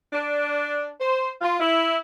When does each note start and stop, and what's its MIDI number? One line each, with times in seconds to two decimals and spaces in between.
0.13 0.89 62
1.00 1.28 72
1.41 1.57 65
1.60 1.95 64